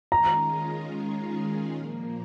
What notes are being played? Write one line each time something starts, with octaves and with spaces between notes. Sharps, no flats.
D#3 G#3 C#4 F4 G#4 A#5
A#2 F3 A#3